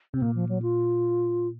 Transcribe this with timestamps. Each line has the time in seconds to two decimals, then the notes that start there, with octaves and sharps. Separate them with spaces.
0.14 C3 C4
0.22 A#2 A#3
0.35 F3
0.49 F#3
0.62 F4